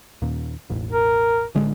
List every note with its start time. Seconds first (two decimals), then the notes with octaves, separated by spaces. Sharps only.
0.22 D#2 A#2
0.70 E1 A1
0.91 A#4
1.55 A1 D3 G#3